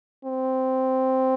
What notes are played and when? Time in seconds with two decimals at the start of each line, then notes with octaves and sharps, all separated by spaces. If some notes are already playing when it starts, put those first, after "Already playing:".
0.25 C4